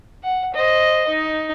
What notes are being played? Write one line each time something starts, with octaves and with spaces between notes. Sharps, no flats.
F#5
C5 D#5
D#4